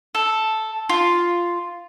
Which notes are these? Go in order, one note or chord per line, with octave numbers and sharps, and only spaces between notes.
A4
F4